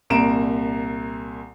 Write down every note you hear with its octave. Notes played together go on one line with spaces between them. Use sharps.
C2 A#2 A#5 D7 E7